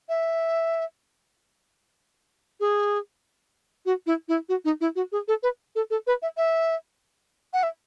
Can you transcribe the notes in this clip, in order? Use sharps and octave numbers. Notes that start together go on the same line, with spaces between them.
E5
G#4
F#4
E4
E4
F#4
D#4
E4
F#4
G#4
A4
B4
A4
A4
B4
E5
E5
F#5
E5